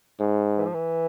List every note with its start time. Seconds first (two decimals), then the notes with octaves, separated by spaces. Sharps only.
0.20 G#2
0.58 E3
0.66 F3
0.74 E3